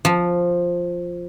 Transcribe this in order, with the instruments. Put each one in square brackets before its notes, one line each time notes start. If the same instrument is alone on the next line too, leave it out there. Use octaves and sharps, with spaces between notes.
[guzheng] F3